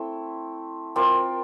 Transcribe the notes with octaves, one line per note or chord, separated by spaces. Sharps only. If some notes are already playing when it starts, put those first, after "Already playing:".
Already playing: A3 C4 E4
C4 F4 A#4 D5